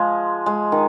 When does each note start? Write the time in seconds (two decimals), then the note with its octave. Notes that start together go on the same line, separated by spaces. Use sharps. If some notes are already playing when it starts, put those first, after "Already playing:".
Already playing: F3 G#3
0.46 G#3
0.72 D#3